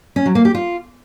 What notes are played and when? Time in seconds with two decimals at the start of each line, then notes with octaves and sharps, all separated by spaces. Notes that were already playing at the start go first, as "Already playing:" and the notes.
0.16 C#4
0.26 F#3
0.35 A#3
0.45 G4
0.55 F4